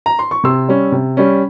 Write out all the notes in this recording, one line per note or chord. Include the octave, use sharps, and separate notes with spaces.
A#5
C6
C#6
C3 C6 E6
G3 C#4
C3
G3 C#4